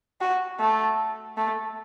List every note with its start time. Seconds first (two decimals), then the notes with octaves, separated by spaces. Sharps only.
0.21 F#4
0.60 A3
1.37 A3